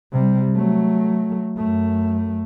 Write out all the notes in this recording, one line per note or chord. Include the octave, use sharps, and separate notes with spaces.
C3 G3
F#3 A3
F#2 A3